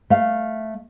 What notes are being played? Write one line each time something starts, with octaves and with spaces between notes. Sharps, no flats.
A3 F5